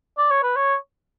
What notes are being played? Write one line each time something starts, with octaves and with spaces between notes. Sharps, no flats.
D5
C#5
B4
C#5